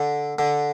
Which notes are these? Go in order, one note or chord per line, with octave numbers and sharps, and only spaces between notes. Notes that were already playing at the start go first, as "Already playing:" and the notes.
Already playing: D3
D3